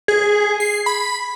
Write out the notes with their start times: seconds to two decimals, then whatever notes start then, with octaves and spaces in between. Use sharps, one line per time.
0.08 G#4
0.60 C7
0.86 B5